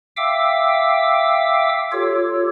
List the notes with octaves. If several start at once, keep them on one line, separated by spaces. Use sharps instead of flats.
E5 F5 G5 D6 E6
F4 G4 A4 C#5